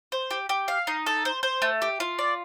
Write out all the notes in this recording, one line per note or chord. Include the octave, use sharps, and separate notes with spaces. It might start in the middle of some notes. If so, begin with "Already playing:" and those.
C5
G4
G4
F5
D#4
A4
C5
C5
A3
G4
F4
D5